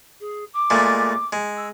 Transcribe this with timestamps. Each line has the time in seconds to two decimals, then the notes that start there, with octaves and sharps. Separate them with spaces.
0.20 G#4
0.53 D6
0.70 A#2 G#3 A3
1.33 G#3
1.57 E6